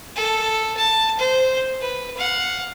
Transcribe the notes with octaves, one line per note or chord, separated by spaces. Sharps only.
A4
A5
C5
B4
F5 F#5